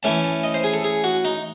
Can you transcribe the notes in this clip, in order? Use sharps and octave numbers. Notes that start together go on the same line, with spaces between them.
E3 A3 C#4 A5
A5
D#5
C5
G#4
A4
G#4
F#4
D#4